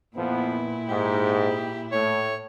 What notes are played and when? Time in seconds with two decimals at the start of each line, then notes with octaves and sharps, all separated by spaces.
0.16 F2 A#2 F3 B3 E4
0.89 G#2 G4
1.92 A2 C#5